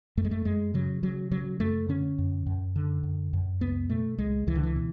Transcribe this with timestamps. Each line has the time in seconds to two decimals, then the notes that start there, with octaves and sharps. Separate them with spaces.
0.17 F#2 A3
0.25 G#3
0.31 A3
0.45 F#2 G#3
0.74 C#3 F#3
1.03 C#3 F#3
1.31 C#3 F#3
1.60 F#2 A3
1.89 D3 C#4
2.18 F#2
2.46 F#2
2.76 D3
3.03 F#2
3.33 F#2
3.61 C#2 B3
3.90 B2 A3
4.18 C#2 G#3
4.47 C#2 E3
4.55 D3
4.63 E3
4.76 B2